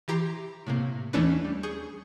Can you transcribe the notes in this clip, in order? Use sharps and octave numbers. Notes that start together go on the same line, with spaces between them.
E3 G4 A#5 C6
A2 C3 A#3
D#2 E3 A3 C#4 D4 B4
G3
G#4 C#6 G6